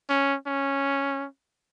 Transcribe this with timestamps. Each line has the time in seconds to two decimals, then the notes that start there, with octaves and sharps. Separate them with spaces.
0.09 C#4
0.46 C#4